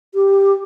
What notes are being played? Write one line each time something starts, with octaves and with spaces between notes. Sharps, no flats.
G4